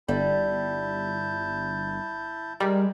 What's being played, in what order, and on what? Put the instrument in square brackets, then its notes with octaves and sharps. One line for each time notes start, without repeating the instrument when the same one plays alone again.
[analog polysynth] G1 [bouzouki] G3 [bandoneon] E4 A5 G6
[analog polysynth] G3 [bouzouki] G#3 [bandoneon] A#4